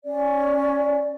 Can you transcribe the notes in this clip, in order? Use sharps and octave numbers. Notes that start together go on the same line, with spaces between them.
C#4 D5